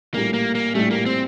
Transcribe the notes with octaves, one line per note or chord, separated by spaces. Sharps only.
A#1 A2 G3 A#3
A#3
A#3
A#1 A2 G3 A3
A#3
C4